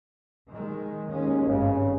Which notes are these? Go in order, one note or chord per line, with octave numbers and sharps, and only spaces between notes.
D#3 G#3
D#2 G#3 C#4
G#1 G2 C#3